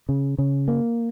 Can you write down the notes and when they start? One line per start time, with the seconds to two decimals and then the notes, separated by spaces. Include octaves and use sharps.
0.09 C#3
0.38 C#3
0.68 A#3